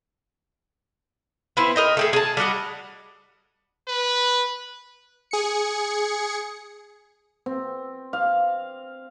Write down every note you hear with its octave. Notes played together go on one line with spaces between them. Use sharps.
B3 C4 E4
A#4 D#5 G5
A3 G4 G#4
G#4 A5
G3 D4 F#4 D#5
B4
G#4 C#7
C4
F5